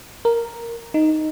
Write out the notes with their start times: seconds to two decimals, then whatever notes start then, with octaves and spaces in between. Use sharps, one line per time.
0.25 A#4
0.94 D#4